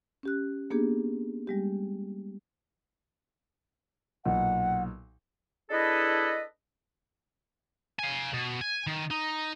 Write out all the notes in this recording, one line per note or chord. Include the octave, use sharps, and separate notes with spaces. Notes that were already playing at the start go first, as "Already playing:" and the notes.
C#4 G4 F#6
A#3 B3 D4 G4 G#4
G3 G#3 G4
B1 A#2 F#5
D4 E4 G#4 A4 B4 D#5
F5 G#5
B2
G#5
D#3
D#4